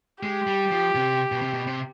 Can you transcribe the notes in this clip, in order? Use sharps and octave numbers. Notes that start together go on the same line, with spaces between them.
G#3 G4
G3
F3
C3
B2
C3
B2
C3